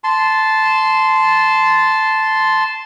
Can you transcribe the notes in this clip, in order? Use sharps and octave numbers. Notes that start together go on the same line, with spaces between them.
A5 C6